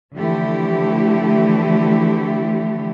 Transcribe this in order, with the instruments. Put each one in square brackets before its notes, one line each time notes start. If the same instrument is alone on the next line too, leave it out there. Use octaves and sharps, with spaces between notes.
[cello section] D3 E3 F3 A3 E4 G4